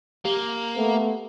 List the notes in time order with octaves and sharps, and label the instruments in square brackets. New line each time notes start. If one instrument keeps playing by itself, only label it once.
[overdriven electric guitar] A#3 [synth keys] G4
[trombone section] A3 B3